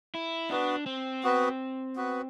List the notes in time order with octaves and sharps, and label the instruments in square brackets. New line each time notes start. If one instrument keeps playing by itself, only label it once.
[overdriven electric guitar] E4
[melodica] B3 F#4 B4 [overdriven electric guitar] D4
[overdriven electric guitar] C4
[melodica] B3 F#4 B4
B3 F#4 B4